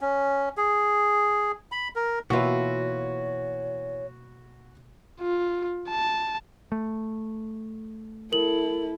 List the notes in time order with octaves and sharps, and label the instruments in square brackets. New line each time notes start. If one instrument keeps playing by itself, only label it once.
[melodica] C#4
G#4
B5
A#4
[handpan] B2 A#3 E5 [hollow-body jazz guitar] E3 F4 [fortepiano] F#4 B4 [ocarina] C#5
[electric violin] F4
A5
[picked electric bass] A3
[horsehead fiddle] E4 A4 [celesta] A#4 F#7